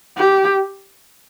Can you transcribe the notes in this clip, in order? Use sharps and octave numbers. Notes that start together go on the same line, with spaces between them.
G4